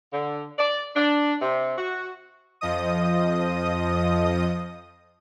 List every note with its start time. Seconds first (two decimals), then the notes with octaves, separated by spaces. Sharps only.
0.13 D3
0.59 D5
0.96 D4
1.41 C3
1.78 F#4
2.61 F2 F3 D#5 D#6